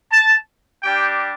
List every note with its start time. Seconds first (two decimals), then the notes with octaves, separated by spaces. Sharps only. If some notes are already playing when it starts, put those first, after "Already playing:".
0.11 A5
0.83 G3 D4 G4 G5